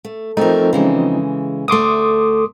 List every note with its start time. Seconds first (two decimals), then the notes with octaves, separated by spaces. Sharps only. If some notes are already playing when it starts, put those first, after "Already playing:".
0.05 A3
0.37 F3 A3 C4 D#4 A#4
0.73 C#3 E3 G#3
1.68 D2 A3 C6 D6 D#6